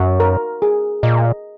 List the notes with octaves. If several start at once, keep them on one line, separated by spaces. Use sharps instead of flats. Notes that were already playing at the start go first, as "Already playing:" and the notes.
Already playing: F#2 F#4
A#4
G#4
A#2 D#5